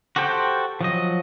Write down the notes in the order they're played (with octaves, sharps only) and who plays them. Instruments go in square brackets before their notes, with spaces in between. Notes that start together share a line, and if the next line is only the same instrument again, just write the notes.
[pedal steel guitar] F#4 G4 A4 C5 G5
F3 F#3 D#5